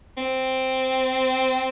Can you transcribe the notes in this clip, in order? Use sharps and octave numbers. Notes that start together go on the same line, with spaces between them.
C4